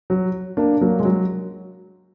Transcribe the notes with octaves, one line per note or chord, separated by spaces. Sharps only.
F#3
A#3 D4
F#3 A#3
G#3
F#3